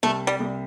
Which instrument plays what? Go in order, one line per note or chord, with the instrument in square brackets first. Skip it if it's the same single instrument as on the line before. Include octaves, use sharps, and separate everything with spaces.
[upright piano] C2 [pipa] A3
[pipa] G3
[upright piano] C2